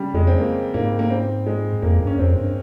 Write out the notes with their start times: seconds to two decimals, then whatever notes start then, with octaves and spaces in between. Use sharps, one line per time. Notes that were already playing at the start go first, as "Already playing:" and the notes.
Already playing: C#3 G3
0.14 F2 G#3
0.27 C4
0.38 A#3
0.74 G#2 A#3
0.99 A#3
1.10 C4
1.46 G#3
1.82 F2 A#3
2.00 G2
2.07 C#4
2.19 F2 C4
2.36 G2